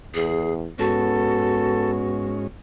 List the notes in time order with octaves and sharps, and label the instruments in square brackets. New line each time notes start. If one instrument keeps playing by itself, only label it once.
[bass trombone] E2 [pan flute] G#4
[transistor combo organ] G#2 C#4 [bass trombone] B3 [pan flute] F#4 [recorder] A4